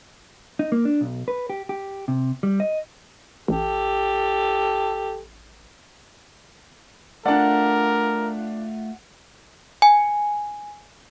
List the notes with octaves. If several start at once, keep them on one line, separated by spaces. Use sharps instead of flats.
D#4
A#3
D4
B1
B4
G4
G4
C3
G3
D#5
A1 G4 A4
A3 D4 F4 A#4 D5 F#5
G#5